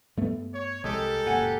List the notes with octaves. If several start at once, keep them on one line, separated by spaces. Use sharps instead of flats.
G2 A3 B3
C#5
C2 G#3 G4 A4 A#4
F#1 A#2 F#5 G#5